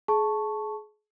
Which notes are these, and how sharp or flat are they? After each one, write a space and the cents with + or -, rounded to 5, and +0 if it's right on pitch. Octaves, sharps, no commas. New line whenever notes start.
G#4 +30 A5 +0 C#6 +0